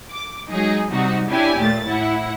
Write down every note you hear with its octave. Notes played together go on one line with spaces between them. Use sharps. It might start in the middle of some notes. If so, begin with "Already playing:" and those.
D6
F#3 G#3 D#4 G#4
C3 G3 D#4 F#4
C#4 D4 E4 G4 G#5
D#2 A#2 A3 A6
A2 E4 F#5